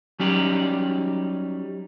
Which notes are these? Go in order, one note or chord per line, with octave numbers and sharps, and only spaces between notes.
F#3 G3 C#4 D#4 G4 D5